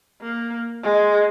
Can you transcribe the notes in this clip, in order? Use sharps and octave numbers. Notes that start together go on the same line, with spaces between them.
A#3
G#3